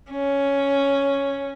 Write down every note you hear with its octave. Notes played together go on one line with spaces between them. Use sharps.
C#4